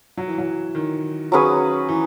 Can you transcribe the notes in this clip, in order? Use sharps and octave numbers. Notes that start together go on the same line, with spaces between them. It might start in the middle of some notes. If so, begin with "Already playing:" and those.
F#3
E3
F#3
D#3
F#3 C#4 G#4 B4
E3